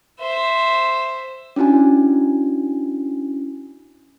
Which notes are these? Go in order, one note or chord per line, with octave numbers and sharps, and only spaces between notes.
C5 E5
C#4 D4 E4 F#4 G#5